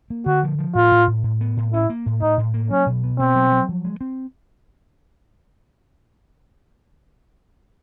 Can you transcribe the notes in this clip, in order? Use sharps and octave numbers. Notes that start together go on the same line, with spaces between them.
A#3
D3 F#4
F3
F3
A2 F4
A2
A2
A2
B3
A2
C#4 E4
A#3
A2
A2 D#4
A2
A#3
F#3 C#4
B2
B3
B2 C4
F#3
F#3
F3
G#3
C4